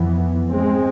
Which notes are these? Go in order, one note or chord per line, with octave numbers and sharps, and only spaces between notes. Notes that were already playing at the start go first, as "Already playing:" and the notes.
Already playing: F2 E3 B3
G#2 G#3 C4